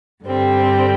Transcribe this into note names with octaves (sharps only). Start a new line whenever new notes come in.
G2 D3 G3 C4